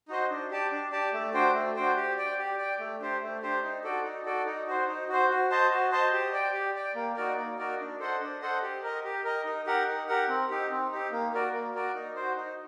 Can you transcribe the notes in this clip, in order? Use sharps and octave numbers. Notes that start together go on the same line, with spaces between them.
D#4 F#4 C5 D#5
D4
G4 D5 A5
D4
G4 D5 A5
A3
D4 F#4 C5 G5
A3
D4 F#4 C5 G5
G4
D5 G5
G4
D5 G5
A3
D4 G4 C5
A3
D4 G4 C5
D#4
F#4 A4 D5
D#4
F#4 A4 D5
D#4
F#4 C5
D#4
F#4 C5
F#4
C5 D#5 A5
F#4
C5 D#5 A5
G4
D5 G5
G4
D5 G5
A#3
D#4 F#4 A#4 D5
A#3
D#4 F#4 A#4 D5
D4
A4 C5 D#5 F#5
D4
A4 C5 D#5 F#5
G4
A#4 D#5
G4
A#4 D#5
D#4
G4 A#4 F#5
D#4
G4 A#4 F#5
C4
D#4 G4
C4
D#4 G4
A#3
F#4 A#4 D5
A#3
F#4 A#4 D5
D#4
F#4 C5
D#4